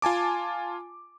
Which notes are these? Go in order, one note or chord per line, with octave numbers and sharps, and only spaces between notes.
F4 G#5 A5 D6